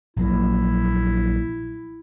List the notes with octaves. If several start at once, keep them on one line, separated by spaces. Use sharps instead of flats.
A#1 F#3 A#3 E4